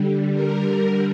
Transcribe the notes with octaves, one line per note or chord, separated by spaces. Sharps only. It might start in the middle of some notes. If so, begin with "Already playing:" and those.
Already playing: D3 G3
A#4